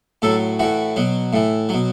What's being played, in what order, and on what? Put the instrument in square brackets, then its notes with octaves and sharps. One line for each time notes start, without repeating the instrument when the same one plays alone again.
[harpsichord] A2 F#3 A4
A2 E3 F#4
B2 F#3
A2 E3
B2 F#3